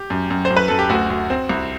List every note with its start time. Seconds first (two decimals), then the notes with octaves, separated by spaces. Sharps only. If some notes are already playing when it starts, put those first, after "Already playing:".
Already playing: G4
0.10 F#2
0.30 F#2
0.45 C5
0.50 F#2
0.57 B4
0.68 F#2 A4
0.79 G4
0.89 D2 F#4
1.10 D2
1.30 C4
1.49 C2